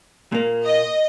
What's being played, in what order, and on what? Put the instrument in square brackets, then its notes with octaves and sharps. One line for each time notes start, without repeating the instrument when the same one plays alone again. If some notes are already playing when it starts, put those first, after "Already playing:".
[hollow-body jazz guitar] A#2 A#3
[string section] D#5